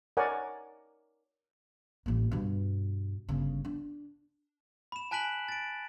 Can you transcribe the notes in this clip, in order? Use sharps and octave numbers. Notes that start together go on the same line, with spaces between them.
A#4 C#5 D5 F#5 G#5
A1 A#3
G2 B2
G1 C#3
D4
B5 E7
G#5 A5 F#6 B6 D7 F#7
A6 D7